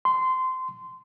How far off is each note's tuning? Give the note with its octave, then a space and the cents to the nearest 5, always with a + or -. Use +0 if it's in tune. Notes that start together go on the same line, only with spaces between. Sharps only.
C6 -20